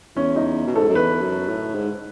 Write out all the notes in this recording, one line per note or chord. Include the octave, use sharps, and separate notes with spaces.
E2 C#4
D#4
B2
A2 A4
G#2
F#2
E2 B4
F#2
A2
G#2